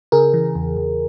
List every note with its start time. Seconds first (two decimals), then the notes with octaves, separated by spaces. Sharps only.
0.12 C#3 G#4 A#4
0.34 E3
0.55 E2
0.77 E2